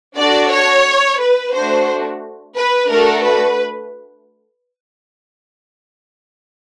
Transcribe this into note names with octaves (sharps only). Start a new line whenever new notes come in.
D4 F#4 A4 D5
C#5
B4
A3 D4 F#4 C5
B4
A3 D4 F#4 A4 A#4
B4